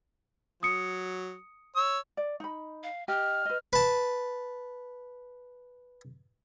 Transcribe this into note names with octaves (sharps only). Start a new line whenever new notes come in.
F#3 D#6 C#7
C#5 E6
D5
D#4 B5
F5
G4 D#5 F6
B4 D#5
B4 A5